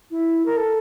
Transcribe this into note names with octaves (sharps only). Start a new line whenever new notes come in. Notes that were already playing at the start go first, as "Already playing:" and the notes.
E4
A#4
A4